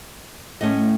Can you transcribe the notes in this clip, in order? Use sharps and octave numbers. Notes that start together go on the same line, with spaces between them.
A2 A3 C#4 D#5